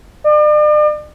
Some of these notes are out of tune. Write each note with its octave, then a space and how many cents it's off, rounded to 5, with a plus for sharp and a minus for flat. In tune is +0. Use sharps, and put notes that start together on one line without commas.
D5 +40